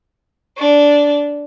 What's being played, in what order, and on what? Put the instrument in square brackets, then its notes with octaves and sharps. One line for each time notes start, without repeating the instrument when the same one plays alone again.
[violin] D4